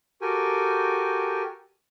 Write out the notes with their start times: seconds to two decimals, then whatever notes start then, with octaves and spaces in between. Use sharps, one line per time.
0.22 F#4 G4 A4 A#4 G5 G#5